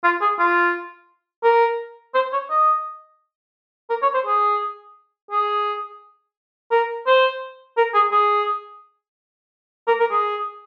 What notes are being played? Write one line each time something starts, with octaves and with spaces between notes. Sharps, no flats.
F4
G#4
F4
A#4
C5
C#5
D#5
A#4
C#5
C5
G#4
G#4
A#4
C5
A#4
G#4
G#4
A#4
A#4
G#4